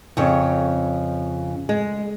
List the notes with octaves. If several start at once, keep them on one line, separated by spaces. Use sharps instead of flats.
F2 C#3 C#5
G#3